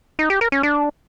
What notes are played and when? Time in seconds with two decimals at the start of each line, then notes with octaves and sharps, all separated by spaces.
0.19 D#4
0.30 G4
0.41 A#4
0.52 C#4
0.63 D4